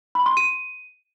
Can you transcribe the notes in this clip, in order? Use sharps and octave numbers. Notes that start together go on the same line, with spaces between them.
B5
C6
D#7